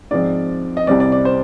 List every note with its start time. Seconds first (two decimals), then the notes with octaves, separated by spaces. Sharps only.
0.11 G#2 F3 C4 D5
0.77 D#5
0.87 C2 C3 G3 C4 D5
1.00 D5
1.12 D5
1.25 C5